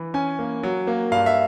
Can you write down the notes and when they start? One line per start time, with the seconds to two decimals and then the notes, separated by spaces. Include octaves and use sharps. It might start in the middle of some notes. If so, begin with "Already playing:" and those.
Already playing: E3
0.14 C#4 G#5
0.39 A#3
0.63 F#3
0.87 A#3
1.12 G2 F5
1.26 E5